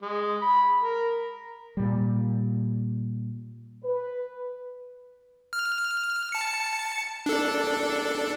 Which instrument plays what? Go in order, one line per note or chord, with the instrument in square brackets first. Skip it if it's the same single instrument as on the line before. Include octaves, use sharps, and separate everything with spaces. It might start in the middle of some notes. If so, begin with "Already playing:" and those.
[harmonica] G#3
B5
A#4
[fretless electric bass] A#2 G3
[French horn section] B4
[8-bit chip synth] F6
A5 C#7
D4 A4